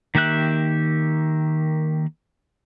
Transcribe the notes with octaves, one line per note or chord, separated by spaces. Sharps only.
D#3 A#3 G4 E5 F#6